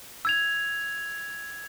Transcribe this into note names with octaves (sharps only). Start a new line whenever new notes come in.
E6 G#6 F7